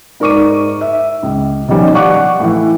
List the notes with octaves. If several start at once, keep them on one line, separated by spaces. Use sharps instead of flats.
G#2 A#4 D5 C#6 D6 D#7
E5
C#2
B2 D#3 F3 G3 C#4
D5 F5 F#5 C#6 D6 F#6
A2 E3